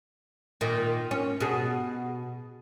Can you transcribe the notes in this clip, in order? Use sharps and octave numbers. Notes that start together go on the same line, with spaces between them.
A#2 D#3
C#4
B2 G#4